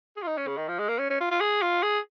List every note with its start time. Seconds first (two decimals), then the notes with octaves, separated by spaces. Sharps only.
0.17 G#4
0.22 F4
0.27 D#4
0.37 C#4
0.47 C#3
0.57 D#3
0.68 F3
0.79 G#3
0.89 A#3
0.99 C#4
1.10 C#4
1.21 F4
1.31 F4
1.40 G#4
1.62 F4
1.83 G#4